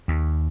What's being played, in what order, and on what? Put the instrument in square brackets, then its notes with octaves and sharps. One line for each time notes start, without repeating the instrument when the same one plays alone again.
[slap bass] D#2